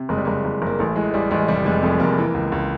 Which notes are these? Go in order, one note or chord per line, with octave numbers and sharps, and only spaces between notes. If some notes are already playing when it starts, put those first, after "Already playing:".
Already playing: C3
F#1 G#3
G3
F#1 G#3
F#1
F#1 A#3
A1 A3
E3 G#3
A1 G3
A1 G#3
F1 G3
F1 G#3
F2 A3
F1 A#3
E3
C#2
C#2